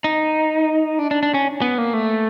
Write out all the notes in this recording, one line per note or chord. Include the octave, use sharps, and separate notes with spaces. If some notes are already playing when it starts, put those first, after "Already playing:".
D#4
D4
D4
D4
C#4
B3
A#3
A3